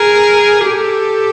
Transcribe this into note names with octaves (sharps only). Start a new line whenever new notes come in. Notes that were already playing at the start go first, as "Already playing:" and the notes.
Already playing: G#4 A#4
G4 A4